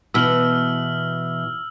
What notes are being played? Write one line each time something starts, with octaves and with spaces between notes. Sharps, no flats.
B2 E3 E6 F6 F#7